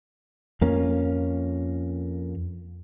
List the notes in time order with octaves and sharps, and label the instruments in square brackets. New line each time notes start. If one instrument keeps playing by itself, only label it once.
[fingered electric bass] F2 A#3 C#4